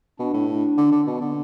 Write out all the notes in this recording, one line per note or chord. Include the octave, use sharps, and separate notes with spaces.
B2 D4
A2
D4
D3
D3
B2 B3
D3